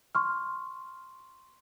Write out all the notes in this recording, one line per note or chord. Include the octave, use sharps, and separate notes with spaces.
C6 C#6 F6